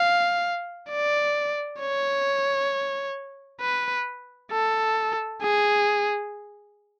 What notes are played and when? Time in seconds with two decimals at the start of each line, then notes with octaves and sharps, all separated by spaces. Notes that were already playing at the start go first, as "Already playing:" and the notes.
Already playing: F5
0.89 D5
1.80 C#5
3.61 B4
4.51 A4
5.42 G#4